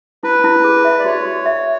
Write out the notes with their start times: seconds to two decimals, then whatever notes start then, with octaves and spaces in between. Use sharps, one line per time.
0.23 E4 B4
0.44 E4
0.64 G#4
0.85 E5
0.99 D5
1.05 F#4 C#5
1.26 F#4
1.46 E5